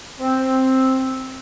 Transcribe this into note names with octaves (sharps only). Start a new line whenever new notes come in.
C4